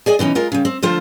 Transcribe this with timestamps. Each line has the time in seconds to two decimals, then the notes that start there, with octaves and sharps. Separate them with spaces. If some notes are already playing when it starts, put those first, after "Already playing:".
0.06 G#4 D5 D#5 G#5
0.19 B2 E3 C#4 D#4
0.35 G#3 F4 A#4
0.52 C#3 G3
0.65 C4
0.83 D3 F3 A3 F4 C5